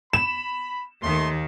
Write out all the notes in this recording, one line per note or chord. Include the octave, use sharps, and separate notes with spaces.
B5 E7
D#2 D#3 A3 D#5 C6